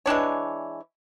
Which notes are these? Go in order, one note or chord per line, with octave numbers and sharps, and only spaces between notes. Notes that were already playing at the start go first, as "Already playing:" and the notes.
E3 G#3 D4 C#5